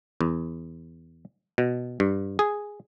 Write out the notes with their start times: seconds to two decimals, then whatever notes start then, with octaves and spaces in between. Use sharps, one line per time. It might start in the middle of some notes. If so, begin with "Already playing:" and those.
0.21 E2
1.58 B2
2.00 G2
2.39 G#4